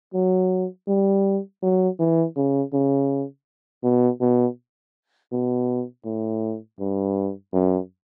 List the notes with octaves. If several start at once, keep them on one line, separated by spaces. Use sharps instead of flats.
F#3
G3
F#3
E3
C#3
C#3
B2
B2
B2
A2
G2
F#2